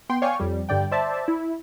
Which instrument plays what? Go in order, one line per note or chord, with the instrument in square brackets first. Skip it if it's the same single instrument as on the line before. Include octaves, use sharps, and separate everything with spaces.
[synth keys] B3 G5 C6
C#5 D5 F5 G5 G#5 C#6
F2 G3
G2 D3 D5 G5
C5 D5 E5 A5
E4